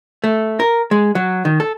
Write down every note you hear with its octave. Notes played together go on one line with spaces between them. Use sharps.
A3
A#4
G#3
F#3
D#3
A4